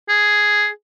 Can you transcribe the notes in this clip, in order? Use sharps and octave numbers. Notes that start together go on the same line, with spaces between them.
G#4